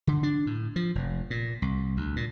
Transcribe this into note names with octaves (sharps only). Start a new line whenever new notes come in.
D3
D4
A2
F3
F1
A#2
C2
D2
A#2